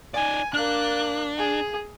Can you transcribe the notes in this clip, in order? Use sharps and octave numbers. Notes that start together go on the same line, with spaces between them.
D#4 D5 G#5
A#3 D4 F#6
G#4